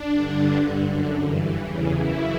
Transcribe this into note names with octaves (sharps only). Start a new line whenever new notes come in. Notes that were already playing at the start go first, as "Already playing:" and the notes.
Already playing: D4
G2 D3
G2 D3
F#2 D3
G2 E3
E2 C#3 E3
F#2 C#3 E3 E4